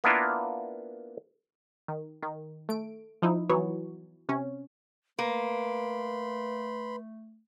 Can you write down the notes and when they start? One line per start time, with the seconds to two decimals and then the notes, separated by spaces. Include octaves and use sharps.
0.04 A#3 B3 D4 E4 F4 A#4
1.88 D#3
2.23 D#3
2.69 A3 D7
3.22 F3 D#4 E4
3.49 E3 F#3 B3 C#5
4.29 C3 C#4
5.19 A3 A#3 B4 B5 C6